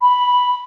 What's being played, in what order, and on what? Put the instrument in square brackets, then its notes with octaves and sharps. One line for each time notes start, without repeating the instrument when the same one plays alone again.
[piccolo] B5